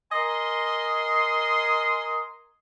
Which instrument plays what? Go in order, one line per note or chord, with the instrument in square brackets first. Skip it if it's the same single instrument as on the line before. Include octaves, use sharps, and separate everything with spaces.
[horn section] A#4 D#5 G#5 C6